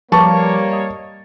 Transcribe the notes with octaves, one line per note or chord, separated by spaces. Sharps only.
F3 G3 A#3 B4 C#5 A5 C#6 D6
D#5